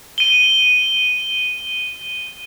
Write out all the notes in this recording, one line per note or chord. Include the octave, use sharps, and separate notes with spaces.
D#7 G7